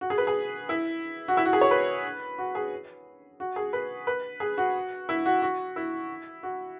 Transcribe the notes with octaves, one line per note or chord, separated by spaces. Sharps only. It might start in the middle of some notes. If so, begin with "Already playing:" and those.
F#4
G#4
B4
G#4
E4
F#4
E4
F#4
G#4
C#5
B4
F#4
G#4
F#4
G#4
B4
B4
G#4
F#4
E4
F#4
F#4
E4
F#4